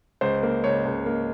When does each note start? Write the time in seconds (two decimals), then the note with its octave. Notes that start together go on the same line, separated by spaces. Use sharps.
0.21 C#2 C5
0.43 A#3
0.64 C#2 C#5
0.85 C#2
1.06 A#3